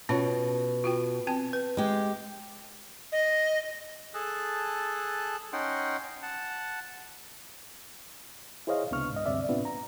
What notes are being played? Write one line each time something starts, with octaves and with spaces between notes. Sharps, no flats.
B2 C#4 F4 C#5
F4 F#4 G5
C4 G5 A5
B4
G#3 G4
D#5
G#4 A4 A5 F#6
C#4 D#4 F#5 G5 C6
F#5 A5
E4 G#4 C5 C#5 D#5 F5
C#2 C3 B3 D4 C#6 F6
G#2 D#5
D2 G2 C3 C4 D5 E5
A2 C3 B3 C4 D4 F4
A#5